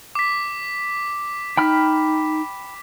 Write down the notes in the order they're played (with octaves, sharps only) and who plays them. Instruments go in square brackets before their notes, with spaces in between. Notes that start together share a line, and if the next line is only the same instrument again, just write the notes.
[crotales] D6 B6
[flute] D#4 [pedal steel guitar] G5 B5 F6